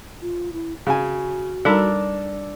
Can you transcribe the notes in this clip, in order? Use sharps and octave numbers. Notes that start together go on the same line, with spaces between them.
F4
E4
C#3 F#4 G#5
G3 D4 D#4 A4 A#4